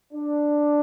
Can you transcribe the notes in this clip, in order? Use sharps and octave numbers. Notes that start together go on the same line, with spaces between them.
D4